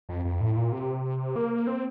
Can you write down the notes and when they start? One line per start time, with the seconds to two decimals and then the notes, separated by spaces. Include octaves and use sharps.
0.09 F2
0.25 F2
0.40 A2
0.56 A#2
0.72 C3
1.36 A#3
1.67 C4